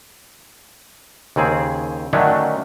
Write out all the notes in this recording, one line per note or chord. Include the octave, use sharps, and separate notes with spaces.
D#2 C#3 C4 G#4
D3 D#3 F#3 A3 C#4 D4